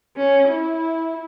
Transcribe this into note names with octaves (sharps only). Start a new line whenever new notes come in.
C#4
E4